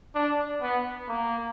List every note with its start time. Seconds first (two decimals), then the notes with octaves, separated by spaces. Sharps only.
0.15 D4
0.62 B3
1.08 A#3